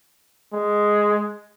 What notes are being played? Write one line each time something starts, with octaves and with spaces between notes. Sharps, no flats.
G#3